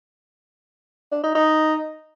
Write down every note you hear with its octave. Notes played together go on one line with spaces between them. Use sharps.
D4
D#4
D#4